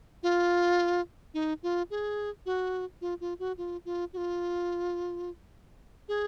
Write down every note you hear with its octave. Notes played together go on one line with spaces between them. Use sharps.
F4
D#4
F4
G#4
F#4
F4
F4
F#4
F4
F4
F#4
F4
G#4